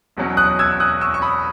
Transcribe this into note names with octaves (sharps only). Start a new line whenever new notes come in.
E1 E2 B2 F#3 C#4
D#6 F#6
E6 G#6
D#6 F#6
C#6 E6
C#6
B5 D#6